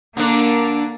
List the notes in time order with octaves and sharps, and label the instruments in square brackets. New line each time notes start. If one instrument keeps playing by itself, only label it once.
[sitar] D3 D4 [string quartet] A#3 A#4